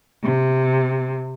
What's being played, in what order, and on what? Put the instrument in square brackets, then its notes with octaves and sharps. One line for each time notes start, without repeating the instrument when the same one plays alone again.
[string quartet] C3